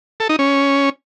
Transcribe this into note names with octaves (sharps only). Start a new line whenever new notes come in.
A4
D#4
C#4